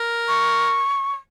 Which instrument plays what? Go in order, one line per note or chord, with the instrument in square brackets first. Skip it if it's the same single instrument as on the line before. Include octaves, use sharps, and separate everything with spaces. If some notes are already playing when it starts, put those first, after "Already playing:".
Already playing: [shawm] A#4
[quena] C#6